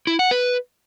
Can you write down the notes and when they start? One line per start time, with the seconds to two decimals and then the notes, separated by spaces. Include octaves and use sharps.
0.07 E4
0.19 F#5
0.31 B4